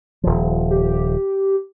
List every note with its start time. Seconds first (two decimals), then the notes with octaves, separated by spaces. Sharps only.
0.24 D#1 F3
0.70 G4